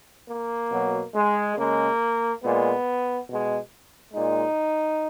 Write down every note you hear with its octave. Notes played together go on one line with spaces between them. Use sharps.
A#3
B2 F#3
G#3
C#3 G#3 A#3
A#2 G#3 B3
B2 G#3
A#2 G#3 D#4